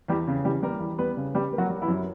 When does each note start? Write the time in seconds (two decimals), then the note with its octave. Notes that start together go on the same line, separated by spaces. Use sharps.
0.08 E2 G3 G4
0.27 C#3
0.44 E2 G3 G4
0.63 G3 A#3 A#4
0.80 E2
0.99 G3 B3 B4
1.17 C#3
1.35 G3 G4
1.53 A#3
1.58 F#3 F#4
1.70 G3
1.82 E3 E4
1.88 F#2